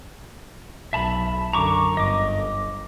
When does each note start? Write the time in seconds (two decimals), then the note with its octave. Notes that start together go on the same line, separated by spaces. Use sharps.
0.93 B1 E5 A5 B5
1.53 F#2 D3 A#5 C#6 D6
1.97 G1 D#5 D6